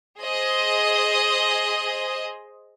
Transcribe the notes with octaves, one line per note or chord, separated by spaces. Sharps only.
G#4 C5 D#5